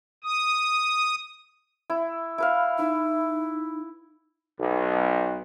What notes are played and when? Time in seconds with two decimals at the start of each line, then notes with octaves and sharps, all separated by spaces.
0.24 D#6
1.90 E4
2.38 E4 B4 F5
2.79 D#4 E4
4.59 B1